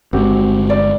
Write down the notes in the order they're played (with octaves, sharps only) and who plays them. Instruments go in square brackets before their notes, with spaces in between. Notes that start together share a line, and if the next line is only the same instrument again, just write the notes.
[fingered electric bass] G1 G#3 [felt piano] C4 F#4 G4
[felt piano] D5